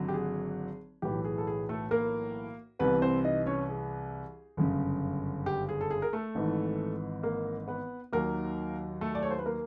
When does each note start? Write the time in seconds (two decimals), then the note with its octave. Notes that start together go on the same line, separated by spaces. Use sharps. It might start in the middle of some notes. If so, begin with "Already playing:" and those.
Already playing: G#1 D3 F#3
0.08 G4
0.14 G#4
1.02 B1 A2 E3 G4
1.25 G#4
1.38 A4
1.47 G#4
1.69 A3 A4
1.91 A#3 A#4
2.79 C2 C3 E3 B3 B4
3.02 C4 C5
3.25 D#4 D#5
3.46 C#4 C#5
3.69 G#4
4.57 G1 F#2 C#3
5.46 G4
5.69 G#4
5.81 A4
5.91 G#4
6.02 A#4
6.13 A3 A4
6.35 G#1 G#2 E3
7.23 A#3 A#4
7.68 B3 B4
8.13 D#2 D#3 F#3 A#3 A#4
9.01 A3 A4
9.15 D5
9.23 C#5
9.31 C5
9.38 B4
9.46 A#3 A#4